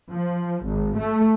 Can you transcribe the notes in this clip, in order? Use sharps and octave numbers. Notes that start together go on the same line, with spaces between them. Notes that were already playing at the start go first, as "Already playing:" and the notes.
F3
G#1
A3